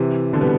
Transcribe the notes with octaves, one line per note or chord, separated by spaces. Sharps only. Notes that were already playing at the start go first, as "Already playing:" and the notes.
Already playing: C3 E3
B2 D3
G3 B3